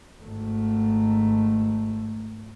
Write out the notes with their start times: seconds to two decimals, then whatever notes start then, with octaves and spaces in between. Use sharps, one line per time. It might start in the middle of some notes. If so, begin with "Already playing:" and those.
0.23 G#1 A3